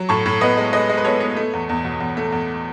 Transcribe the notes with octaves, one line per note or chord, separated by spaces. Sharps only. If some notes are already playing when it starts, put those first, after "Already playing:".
Already playing: F#3
A2 A5 C#6
A2
B3 B4 D#5
G#3
G#3 B4 D#5
G#3
B4
B3 A4 C#5
B3
A3
E2
E2
B2
E2
A3
E2